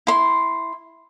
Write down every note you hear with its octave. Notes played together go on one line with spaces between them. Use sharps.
E4 C6